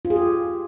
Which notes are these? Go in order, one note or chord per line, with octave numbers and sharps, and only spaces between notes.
F4
G#4
G4